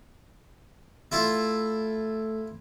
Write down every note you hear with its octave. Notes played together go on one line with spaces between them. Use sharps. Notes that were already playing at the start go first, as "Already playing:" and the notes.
A3 E4 F4 A4